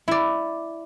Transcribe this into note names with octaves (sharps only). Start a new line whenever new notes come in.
E4 D5